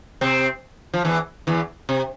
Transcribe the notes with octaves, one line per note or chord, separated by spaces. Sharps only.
C3 C4
F3
E2 E3
E2 E3
C3